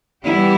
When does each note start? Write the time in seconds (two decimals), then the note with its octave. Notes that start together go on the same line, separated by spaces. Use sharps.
0.24 E3 G3 B3 E4 G4